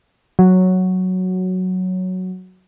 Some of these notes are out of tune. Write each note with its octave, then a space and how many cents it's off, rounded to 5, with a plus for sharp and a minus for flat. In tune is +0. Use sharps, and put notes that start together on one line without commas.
F#3 +0